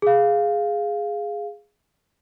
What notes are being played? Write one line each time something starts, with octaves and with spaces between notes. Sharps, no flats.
G#4 F5